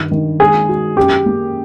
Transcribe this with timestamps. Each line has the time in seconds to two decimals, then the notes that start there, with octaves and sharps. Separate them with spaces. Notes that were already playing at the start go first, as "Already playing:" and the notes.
Already playing: G2 D#3
0.11 D#3
0.40 G#3 G#4
0.69 F#4
0.97 F#2 G4
1.26 A#3